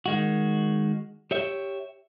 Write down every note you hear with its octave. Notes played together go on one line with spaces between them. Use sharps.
D#3 G#3 F#4
G4 C#5 E5